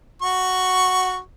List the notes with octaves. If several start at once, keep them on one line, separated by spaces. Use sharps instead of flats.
F#4 C#6